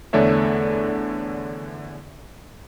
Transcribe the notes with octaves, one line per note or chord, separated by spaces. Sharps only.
E2 D3 A3 D4 C#5 E5